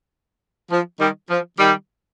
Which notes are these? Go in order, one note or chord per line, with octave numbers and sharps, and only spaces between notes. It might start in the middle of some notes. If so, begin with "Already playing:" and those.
F3
D#3 G3
F3
D#3 G3